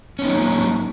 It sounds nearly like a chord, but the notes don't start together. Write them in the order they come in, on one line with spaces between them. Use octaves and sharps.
C#4 B3 D#4 F#3 A#3